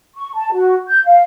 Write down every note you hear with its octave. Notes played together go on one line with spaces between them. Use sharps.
C#6
A5
F#4
G6
F5